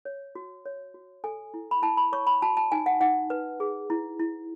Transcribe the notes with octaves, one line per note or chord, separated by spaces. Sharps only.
C#5
F#4
C#5
F#4
A4 G#5
E4
B5
E4 A5
B5
C#5 C#6
B5
F#4 A5
A5
D#4 G#5
F#5
D#4 F#5
B4
G#4
E4
E4